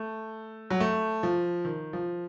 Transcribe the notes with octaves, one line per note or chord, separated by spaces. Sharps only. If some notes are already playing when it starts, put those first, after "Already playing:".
Already playing: A3
F#3
A3
F3
D#3
F3